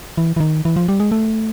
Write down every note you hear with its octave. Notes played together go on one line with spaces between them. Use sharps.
E3
E3
D#3
E3
F3
G3
G#3
A3